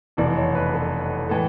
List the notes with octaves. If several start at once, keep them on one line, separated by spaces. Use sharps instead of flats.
F1 E2 B2 D5
C#5
B4
A4
A2 E3 A4